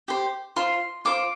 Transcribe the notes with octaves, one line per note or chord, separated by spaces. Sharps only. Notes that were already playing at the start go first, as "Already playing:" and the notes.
G4 C5
F4 C5 C6
F4 C5 D6